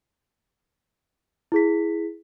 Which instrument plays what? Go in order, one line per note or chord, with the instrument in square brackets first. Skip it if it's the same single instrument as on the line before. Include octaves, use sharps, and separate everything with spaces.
[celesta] E4 G#4 B6